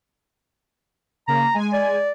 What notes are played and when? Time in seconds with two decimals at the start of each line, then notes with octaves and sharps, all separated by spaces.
1.28 C#3 A#3 A#5
1.54 G#3 G#5
1.73 D5